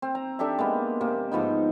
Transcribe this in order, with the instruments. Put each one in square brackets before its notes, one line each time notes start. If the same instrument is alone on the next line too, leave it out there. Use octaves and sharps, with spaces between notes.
[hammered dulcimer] C4
A#5
D4 G4 A4 E5
G#3 A#3 B3
C3 A#3
G#2 F3 B3 D#4